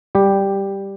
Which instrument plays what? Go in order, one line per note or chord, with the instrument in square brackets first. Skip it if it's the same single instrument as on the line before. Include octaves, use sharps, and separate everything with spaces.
[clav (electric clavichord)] G3 G4